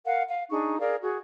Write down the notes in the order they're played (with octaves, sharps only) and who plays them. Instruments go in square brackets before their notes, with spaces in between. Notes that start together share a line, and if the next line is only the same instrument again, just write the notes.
[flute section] A#4 F5 F#5
F5
D4 D#4 G#4 C#6
G#4 A#4 D5 F5
F#4 G#4